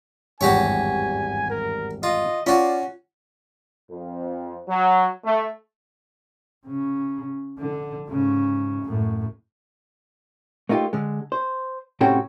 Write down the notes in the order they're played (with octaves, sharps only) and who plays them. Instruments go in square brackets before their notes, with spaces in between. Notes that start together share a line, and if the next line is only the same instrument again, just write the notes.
[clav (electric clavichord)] G#1 E2 G2 [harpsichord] F#4 G4 C#5 [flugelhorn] G#5
[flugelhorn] A#4
[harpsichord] F4 [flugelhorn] D#5
[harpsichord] C#4 F#4 [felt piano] F4 [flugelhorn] D5
[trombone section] F2
F#3
A3
[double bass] C#3
D3
G#2 C#3
F#2 A2
[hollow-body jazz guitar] A3 A#3 D#4 F4 G4
D3 G#3
C5
A2 C3 C#4 F#4 A4 G5